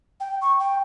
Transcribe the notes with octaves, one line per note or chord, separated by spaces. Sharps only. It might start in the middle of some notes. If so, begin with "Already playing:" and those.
G5
C#6
G5